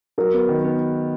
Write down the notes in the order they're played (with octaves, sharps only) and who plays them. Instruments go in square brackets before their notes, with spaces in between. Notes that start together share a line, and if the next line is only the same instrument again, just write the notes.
[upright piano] F#3 [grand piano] A#4
[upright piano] B3
D#3
B3